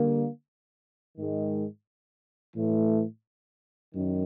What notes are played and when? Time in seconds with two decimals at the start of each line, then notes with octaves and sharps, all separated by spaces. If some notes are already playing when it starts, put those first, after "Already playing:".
Already playing: D3 G3 A#3
1.16 G#2 D#3 G#3
2.54 A2 E3 A3
3.93 F#2 D#3